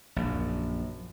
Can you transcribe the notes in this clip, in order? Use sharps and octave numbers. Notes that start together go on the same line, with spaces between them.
A#1 F#2